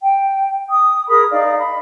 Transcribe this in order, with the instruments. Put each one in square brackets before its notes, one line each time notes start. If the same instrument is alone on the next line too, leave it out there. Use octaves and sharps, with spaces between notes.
[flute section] G5
D#6
G#4 A#4 B5 D#6
D#4 D5 F5
B5